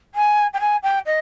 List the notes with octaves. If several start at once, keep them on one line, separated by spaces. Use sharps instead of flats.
G#5
G5
G#5
G5
D#5